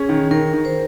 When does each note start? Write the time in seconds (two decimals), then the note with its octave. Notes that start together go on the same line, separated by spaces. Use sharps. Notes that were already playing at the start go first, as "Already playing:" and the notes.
Already playing: C#4 G#4
0.09 D#3
0.31 D#3 A#4
0.53 D#3
0.65 C5